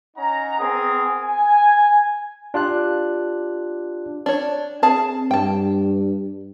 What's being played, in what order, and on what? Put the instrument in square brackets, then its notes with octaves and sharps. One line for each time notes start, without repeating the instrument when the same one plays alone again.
[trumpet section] C#4 D#4 F#5 A#5
B3 C4 G#4 A#4 G#5 D#6
G#5
[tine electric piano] D4 F4 G4 F#6
[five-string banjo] D4 C#5
[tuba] C4 [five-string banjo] G#4 A5
[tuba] G2 [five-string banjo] G5 A5